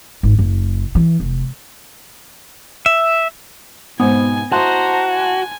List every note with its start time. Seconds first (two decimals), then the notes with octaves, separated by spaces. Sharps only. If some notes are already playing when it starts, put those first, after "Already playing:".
0.23 G#1
0.39 F#1
0.95 E3
1.20 F1
2.86 E5
4.00 G#2 B2 B3 C4 G#5
4.52 E4 F#4 C5 D#5 A5 A#5 C6 F#6
5.11 G#5